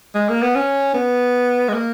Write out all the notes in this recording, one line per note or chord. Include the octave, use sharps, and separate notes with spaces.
G#3
A#3
B3
C#4
B3
G#3
A#3